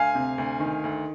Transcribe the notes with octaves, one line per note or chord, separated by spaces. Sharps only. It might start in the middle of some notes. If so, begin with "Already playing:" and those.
Already playing: D2 F5 G#5
C3
D2
D#3
D2